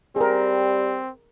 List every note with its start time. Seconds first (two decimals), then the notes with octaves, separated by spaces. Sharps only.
0.16 G3 C4 G#4 A#4